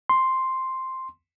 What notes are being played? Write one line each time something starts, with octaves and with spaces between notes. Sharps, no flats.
C6